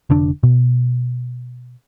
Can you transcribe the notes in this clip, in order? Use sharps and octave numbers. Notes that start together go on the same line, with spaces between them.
F1 D3 D4
B2